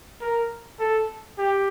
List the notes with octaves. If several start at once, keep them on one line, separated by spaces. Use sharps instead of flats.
A#4
A4
G4